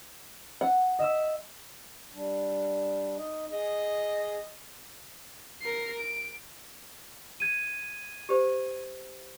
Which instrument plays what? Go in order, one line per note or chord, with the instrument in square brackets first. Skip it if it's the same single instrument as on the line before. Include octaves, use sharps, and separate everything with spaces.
[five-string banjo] F#5
[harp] D#5 E5 E6
[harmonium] G3 D4
D#4 D#5
[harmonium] G#4 [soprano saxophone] D#5
[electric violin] A#4 C7
D7
[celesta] G#6 D#7
[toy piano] G4 C5